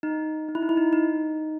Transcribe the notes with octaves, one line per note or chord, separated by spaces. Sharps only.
D#4
D#4
E4
D#4
E4
D#4
D#4